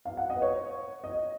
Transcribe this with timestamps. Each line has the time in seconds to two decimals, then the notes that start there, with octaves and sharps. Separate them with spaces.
0.05 F5
0.17 F#5
0.30 D#5
0.36 B4
0.42 C#5
1.04 D#5